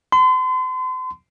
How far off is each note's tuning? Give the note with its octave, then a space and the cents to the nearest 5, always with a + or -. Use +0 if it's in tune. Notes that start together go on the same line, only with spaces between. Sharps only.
C6 -40